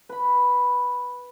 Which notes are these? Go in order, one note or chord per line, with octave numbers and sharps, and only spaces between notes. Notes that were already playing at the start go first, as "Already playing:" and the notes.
B4 B5